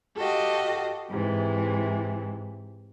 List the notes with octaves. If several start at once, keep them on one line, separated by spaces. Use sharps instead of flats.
F#4 G4 A4 D#5 F5
G#2 C3 E3